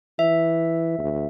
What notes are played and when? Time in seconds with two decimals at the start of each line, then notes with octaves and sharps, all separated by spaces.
0.19 E3 E5
0.98 D2